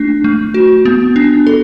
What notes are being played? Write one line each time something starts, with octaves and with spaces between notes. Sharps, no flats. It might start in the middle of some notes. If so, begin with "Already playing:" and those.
Already playing: A3 D4
A3
F#4
B3
D4
A4